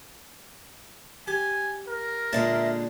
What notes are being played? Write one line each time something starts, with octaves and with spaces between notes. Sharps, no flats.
G4 G#5
A#4
A#2 D3 G#3 E5 A5